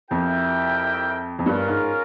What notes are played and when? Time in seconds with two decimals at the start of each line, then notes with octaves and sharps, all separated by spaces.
0.10 F2 E4 G4 A#4 E5 G5
1.39 F2
1.46 G2 C#4 F4 A#4
1.68 G#2